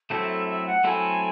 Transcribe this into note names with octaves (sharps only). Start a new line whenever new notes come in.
F#3 A3 C4 E4 A4 E5
E5
E5
F#5
F#3 A3 C4 E4 A4 G#5